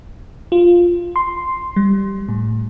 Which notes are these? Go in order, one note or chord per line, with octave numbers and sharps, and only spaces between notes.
F4
C6
G3
A2